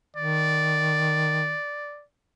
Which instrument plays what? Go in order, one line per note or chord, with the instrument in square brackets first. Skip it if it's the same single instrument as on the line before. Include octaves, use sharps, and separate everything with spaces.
[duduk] D#3 [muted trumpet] D5